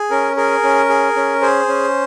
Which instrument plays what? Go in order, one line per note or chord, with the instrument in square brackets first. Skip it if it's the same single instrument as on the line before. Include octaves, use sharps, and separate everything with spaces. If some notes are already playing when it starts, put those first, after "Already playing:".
Already playing: [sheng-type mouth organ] G#4
C#4 A#4
G#4 A#4
C#4
G#4
C#4
G#4 C5
C#4